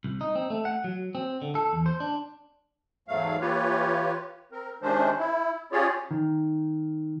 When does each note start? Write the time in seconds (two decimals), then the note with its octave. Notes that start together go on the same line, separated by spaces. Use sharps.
0.04 C2
0.21 D#4
0.35 C4
0.50 A3
0.65 F#5
0.84 F#3
1.15 C4
1.42 D3
1.55 A4
1.73 E2
1.86 C5
2.00 D4
3.08 E2 G#2 F#3 A3 F5
3.41 E3 A#3 F4 G4 B4 C#5
4.52 C4 A#4
4.82 C3 D#3 G#3 C#4 D4 C5
5.18 E4
5.72 C#4 F4 G4 G#4 C#5 D5
6.11 D#3